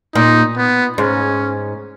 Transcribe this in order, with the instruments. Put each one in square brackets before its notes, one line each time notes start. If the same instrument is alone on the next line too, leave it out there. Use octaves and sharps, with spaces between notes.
[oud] A#2 [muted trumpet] D#4
[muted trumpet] B3
[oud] G#2 [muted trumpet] C#4